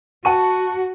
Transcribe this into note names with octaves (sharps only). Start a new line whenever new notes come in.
F#4 F#5 A5 C#6 D#7